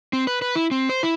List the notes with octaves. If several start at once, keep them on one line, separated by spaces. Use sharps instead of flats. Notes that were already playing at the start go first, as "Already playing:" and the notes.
C4
B4
B4
E4
C4
C5
E4